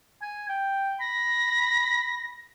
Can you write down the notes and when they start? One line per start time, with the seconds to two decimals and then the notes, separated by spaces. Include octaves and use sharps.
0.22 G#5
0.49 G5
1.00 B5 A#6